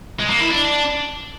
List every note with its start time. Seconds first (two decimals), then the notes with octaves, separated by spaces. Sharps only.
0.20 G#3
0.30 A#3
0.40 E4
0.51 D4